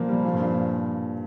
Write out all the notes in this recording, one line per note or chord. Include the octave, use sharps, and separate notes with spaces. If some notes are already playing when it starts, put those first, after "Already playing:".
Already playing: A#2 F3 A#3
G3
A#2
G2
A#2